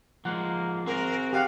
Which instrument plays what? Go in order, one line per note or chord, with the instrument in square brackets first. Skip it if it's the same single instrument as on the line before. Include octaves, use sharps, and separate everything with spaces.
[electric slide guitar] F3 G#3 [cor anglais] A#3 [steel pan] F#5
[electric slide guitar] C4 G#4 [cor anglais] F#4 [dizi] A#4
[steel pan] G4 F#5 [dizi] F5